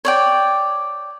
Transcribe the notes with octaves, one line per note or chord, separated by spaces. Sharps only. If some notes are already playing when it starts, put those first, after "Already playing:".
C#5 D5 G5